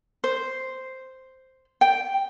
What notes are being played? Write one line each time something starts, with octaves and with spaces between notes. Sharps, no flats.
C5
G5